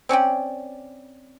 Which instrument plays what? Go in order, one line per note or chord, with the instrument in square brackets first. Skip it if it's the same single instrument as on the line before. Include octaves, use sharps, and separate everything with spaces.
[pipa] C4 C#4 D5 G5